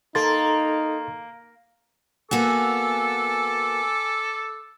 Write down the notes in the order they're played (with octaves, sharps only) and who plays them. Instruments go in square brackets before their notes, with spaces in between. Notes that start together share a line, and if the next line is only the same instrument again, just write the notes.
[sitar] A#3 [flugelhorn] D#4 [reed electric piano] A4 C6 A6
[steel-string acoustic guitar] A#3 B3 F#4 [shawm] A4 [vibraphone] G#5 [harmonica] D6 E6